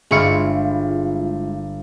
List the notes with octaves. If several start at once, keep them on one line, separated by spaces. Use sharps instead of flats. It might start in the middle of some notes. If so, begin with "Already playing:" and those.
G1 G#3 E4 F4 C#6 C#7